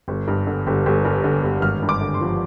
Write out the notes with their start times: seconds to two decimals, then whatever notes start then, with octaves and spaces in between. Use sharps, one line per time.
0.08 G1
0.28 G2
0.47 D3
0.67 G1
0.86 G1
1.05 G2
1.24 D3
1.43 G1
1.62 G#1 F6
1.82 G2
1.89 D6
2.01 D3
2.14 C6
2.21 F3